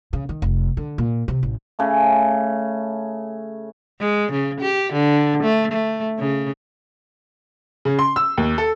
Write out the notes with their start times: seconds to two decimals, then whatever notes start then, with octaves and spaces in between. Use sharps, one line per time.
0.13 C#3
0.29 D#3
0.42 F1
0.77 D3
0.98 A#2
1.28 C3
1.43 A1
1.79 C#3 A3
4.00 G#3
4.32 C#3
4.61 G4
4.93 D3
5.43 A3
5.72 A3
6.19 C#3
7.85 C#3
7.99 C6
8.16 E6
8.38 D#2
8.58 A4